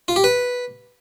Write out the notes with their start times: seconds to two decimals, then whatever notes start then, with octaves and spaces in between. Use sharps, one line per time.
0.08 F4
0.16 G4
0.24 B4